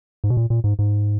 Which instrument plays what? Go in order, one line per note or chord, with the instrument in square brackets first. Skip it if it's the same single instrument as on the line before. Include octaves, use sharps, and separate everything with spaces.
[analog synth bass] G#2
B2
A#2
A#2
G#2
G#2